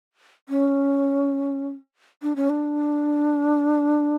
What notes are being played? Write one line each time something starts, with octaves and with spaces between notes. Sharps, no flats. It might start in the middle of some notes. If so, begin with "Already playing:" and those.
C#4
D4
C#4
D4